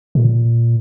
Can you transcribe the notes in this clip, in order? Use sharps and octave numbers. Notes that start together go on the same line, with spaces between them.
A#2